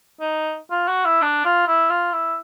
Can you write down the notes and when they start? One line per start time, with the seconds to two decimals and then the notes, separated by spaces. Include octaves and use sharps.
0.20 D#4
0.71 F4
0.88 F#4
1.05 E4
1.22 D4
1.45 F4
1.67 E4
1.90 F4
2.13 E4